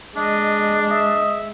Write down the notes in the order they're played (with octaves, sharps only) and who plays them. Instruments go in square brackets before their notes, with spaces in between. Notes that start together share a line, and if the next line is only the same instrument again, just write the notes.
[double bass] G#3 [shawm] D4 [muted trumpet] D#5
[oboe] D#5 [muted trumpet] E5